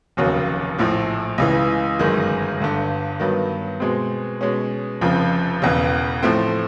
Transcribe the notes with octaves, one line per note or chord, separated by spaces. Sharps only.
F1 D#2 C#3 F#3
A#1 A2 F3
C#2 C#3 E3
G1 F#2 D#3 G#3
G1 G2 D3
G2 D#3 F#3 B3
B2 G#3 C4
B2 G#3 C#4
F1 F2 C#3 F3
E1 E2 C#3
A2 F3 A3 C4